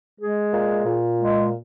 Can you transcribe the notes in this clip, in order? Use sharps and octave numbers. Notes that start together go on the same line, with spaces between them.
G#3 G#4
A#2
A#2
G#3